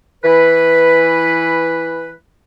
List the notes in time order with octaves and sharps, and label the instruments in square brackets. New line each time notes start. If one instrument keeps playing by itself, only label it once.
[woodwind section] E3 B4